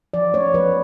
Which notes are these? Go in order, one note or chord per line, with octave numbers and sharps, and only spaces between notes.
F3 D5
A3 C#5
F3 B4